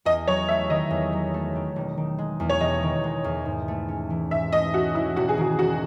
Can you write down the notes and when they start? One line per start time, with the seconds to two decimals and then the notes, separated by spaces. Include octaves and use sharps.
0.05 E2 D#5
0.28 F#3 C#5
0.48 A3 E5
0.70 D#3 D#5
0.90 E2
1.13 F#3
1.34 A3
1.55 D#3
1.76 E1
1.97 D#3
2.18 G#3
2.40 E2
2.49 C#5
2.61 E1 D#5
2.83 D#3
3.04 G#3
3.24 E2
3.46 G#2
3.68 A3
3.89 C#4
4.10 E3
4.31 G#2 E5
4.52 A3 D#5
4.74 C#4 F#4
4.95 E3 E4
5.16 E1 F#4
5.29 G#4
5.37 D#3 F#4
5.59 E1 F#4